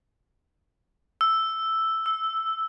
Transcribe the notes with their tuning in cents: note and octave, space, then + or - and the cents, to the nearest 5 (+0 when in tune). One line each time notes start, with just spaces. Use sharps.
E6 +0
E6 -10